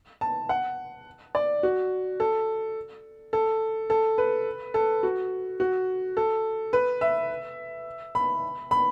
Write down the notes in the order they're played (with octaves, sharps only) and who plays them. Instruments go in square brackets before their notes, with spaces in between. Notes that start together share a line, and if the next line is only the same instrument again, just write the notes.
[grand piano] A5
F#5
D5
F#4
A4
A4
A4
B4
A4
F#4
F#4
A4
B4
E5
B5
B5